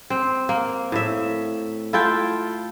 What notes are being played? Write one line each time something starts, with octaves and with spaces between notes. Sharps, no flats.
C4
A#3
A2 E5
E4 F4 A4 G5